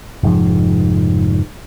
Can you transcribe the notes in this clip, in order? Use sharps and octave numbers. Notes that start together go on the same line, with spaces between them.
F1 G#2 F3